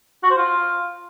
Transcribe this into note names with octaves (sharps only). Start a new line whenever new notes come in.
F#4
C5
F4